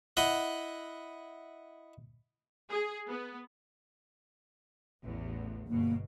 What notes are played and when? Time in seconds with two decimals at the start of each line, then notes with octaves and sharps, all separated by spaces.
0.17 E4 D#5 F#5
2.69 G#4
3.08 B3
5.04 A1 E2
5.68 G1 B2 A#3